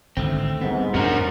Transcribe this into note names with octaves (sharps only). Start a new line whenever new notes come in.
G#1 D2 A2 A3 C4
G#2 G3 B3 C4
F2 A2 C3 B3 C#4 D4 F#4 A#4